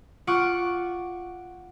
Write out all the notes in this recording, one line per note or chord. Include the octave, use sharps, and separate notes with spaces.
F4 F#5 C#6 D6